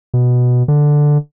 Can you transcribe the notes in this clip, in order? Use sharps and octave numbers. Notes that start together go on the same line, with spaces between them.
B2
D3